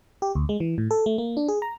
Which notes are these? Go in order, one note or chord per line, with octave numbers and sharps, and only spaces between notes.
G4
D2
G#3
E3
A2
A4
A3
A#3
D4
G#4
A#5